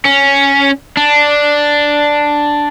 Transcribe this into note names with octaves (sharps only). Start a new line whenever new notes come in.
C#4
D4